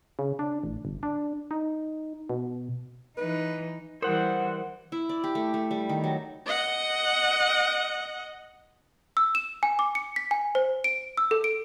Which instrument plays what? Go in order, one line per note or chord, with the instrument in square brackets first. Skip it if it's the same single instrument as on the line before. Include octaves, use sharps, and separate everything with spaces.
[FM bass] C#3
D4
A1
G1
D4
D#4
B2
[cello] E3 D#4 [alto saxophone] B4
[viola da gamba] E3 G3 [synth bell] A#4 [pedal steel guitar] C5 F#5
[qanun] E4
D5
G4
A3
A3
G3
D#3
F#3
[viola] D#5 F#5
[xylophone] E6
E7
G#5
D6
C#7
B6
G#5
C5
D7
E6
A4
D7